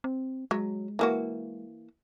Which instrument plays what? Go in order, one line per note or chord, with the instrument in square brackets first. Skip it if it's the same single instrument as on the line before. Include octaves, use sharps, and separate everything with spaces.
[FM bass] C4
[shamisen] F#3 [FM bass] G#3
[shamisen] E3 A#3 F#4